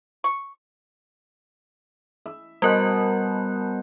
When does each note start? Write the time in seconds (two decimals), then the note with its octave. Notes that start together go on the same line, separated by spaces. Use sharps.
0.24 C#6
2.26 E5
2.62 B2 G3 F#4 A#4 C5 F#6